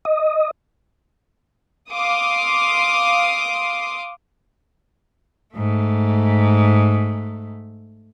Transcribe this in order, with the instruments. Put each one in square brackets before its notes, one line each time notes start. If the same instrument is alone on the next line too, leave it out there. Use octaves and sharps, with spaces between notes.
[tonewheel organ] D#5
[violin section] F5 C6 D6 D#6
[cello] G#2 A3